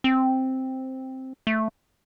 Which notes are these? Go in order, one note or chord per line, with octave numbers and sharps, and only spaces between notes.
C4
A3